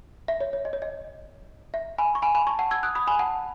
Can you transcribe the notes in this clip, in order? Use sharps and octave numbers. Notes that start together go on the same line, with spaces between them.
E5
C#5
C#5
D#5
C#5
D#5
E5
G#5 B5
C#6
G#5 B5
G#5 B5
A5 C#6
F#5 A5
E6 G#6
D#6 F#6
B5 D#6
G#5 B5
F#5 A5